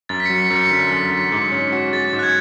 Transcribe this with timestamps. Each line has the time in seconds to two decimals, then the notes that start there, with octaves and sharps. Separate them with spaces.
0.09 F#2 A6
0.20 B6
0.25 F#3 C#7
0.40 B6
0.50 F#2
0.55 C#7
0.71 D3 B6
0.91 F#2
1.11 F#3
1.32 G#2
1.52 C#4
1.72 F#4
1.93 G#3 A6
2.13 G#2
2.19 F#6
2.23 G#6